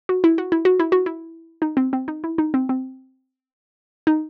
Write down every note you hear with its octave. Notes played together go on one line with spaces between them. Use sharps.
F#4
E4
F#4
E4
F#4
E4
F#4
E4
D#4
C4
C4
D#4
E4
D#4
C4
C4
D#4